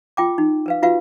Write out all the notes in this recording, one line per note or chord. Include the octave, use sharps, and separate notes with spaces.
F4 G5 D6
D#4
A#4 B4 F5
F4 F#4 B4 F5